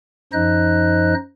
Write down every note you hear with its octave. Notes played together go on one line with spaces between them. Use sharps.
F#2 F3 D#4 C5 D#5 F#6